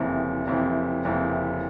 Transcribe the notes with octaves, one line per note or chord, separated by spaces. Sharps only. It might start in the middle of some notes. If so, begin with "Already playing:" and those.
Already playing: F#1 F2 C3 E3
F#1 F2 C3 E3
F#1 F2 C3 E3